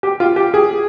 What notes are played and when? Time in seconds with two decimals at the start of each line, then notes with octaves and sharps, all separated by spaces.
0.03 G4
0.20 F4
0.36 G4
0.54 G#4